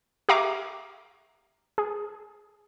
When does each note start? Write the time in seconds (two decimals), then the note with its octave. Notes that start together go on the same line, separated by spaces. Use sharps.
0.29 G4 E5 F5 A#5 C#6 D6
1.78 G#4